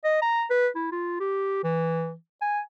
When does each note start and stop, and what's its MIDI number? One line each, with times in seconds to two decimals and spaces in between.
0.04 0.20 75
0.22 0.45 82
0.50 0.68 71
0.76 0.91 64
0.92 1.18 65
1.20 1.61 67
1.64 2.14 52
2.42 2.60 80